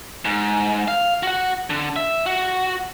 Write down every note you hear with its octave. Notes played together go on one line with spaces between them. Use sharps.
G#2
F5
F#4 F#5
D3
E5
F#4